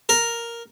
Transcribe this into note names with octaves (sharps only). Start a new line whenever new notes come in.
A#4